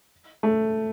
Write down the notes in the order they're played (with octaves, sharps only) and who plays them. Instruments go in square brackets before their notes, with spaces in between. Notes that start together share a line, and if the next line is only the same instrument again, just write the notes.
[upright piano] A3